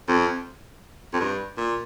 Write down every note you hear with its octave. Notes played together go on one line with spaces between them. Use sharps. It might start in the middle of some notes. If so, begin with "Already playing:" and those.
F2
F2
G2
A#2